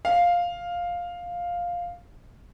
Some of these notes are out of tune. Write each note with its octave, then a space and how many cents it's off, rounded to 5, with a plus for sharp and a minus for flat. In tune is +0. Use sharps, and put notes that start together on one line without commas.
F5 +5